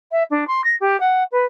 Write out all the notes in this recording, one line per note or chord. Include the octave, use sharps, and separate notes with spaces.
E5
D4
C6
A#6
G4
F#5
B4